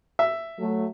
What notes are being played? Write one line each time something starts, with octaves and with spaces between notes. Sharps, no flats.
E5
F#3 A3